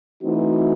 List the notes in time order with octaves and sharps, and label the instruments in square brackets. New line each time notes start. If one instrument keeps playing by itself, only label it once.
[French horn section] E3 A3 C4 D#4 F#4